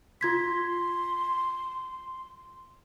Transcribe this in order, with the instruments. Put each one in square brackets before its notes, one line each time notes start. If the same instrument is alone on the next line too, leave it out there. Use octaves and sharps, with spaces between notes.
[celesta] F4 G#6 B6 [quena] C6